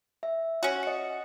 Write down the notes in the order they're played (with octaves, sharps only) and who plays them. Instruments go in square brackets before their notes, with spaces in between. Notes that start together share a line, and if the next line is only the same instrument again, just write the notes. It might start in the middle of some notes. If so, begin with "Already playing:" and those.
[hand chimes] E5
[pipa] C#4 F#4
[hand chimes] D#5 C#7